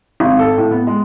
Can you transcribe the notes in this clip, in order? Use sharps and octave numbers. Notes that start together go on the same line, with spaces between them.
G#1
A4
A2
B3
G#3